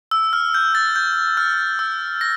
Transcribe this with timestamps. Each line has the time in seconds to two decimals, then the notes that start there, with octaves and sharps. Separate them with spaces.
0.11 E6
0.33 F6
0.54 G6
0.75 A6
0.96 G6
1.37 F6
1.79 E6
2.21 A#6